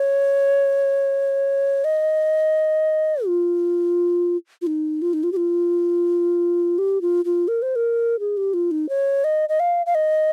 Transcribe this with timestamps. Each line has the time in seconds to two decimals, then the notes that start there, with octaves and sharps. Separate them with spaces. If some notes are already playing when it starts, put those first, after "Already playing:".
Already playing: C#5
1.84 D#5
3.26 F4
4.62 F4
4.67 D#4
5.02 F4
5.13 D#4
5.23 F4
5.32 G4
5.37 F4
6.78 G4
7.02 F4
7.25 F4
7.48 A#4
7.62 C5
7.76 A#4
8.20 G#4
8.37 G4
8.54 F4
8.71 D#4
8.89 C#5
9.24 D#5
9.49 D#5
9.60 F5
9.86 F5
9.95 D#5